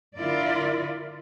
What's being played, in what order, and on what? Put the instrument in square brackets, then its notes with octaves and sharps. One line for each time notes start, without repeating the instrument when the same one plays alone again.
[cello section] D3 E4 F4 A#4 D5